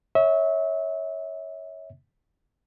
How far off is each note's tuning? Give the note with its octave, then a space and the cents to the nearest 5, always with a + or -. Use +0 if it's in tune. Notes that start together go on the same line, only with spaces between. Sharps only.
C#5 +0 E5 -30